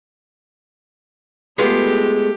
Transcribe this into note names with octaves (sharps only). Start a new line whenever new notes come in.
G#3 A3 B3 F4 G4